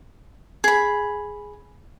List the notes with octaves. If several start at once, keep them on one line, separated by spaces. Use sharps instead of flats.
G#4 B5